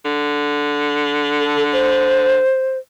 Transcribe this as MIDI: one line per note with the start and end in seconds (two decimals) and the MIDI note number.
0.05 2.40 50
1.40 1.64 69
1.73 2.78 72